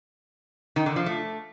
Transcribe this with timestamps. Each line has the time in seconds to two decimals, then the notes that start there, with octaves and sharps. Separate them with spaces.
0.76 D#3
0.86 D3
0.96 F3
1.06 A3